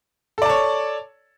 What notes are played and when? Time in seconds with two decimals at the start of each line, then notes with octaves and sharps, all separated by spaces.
0.38 A4
0.42 D5
0.46 A5
0.49 C#5